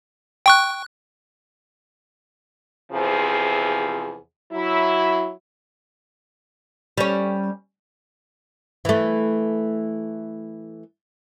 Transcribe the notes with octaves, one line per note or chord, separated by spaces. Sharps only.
G5 C#6 F#6
E2 C3 F3 G#4
F#3 E4
G3 C#4
E3 A3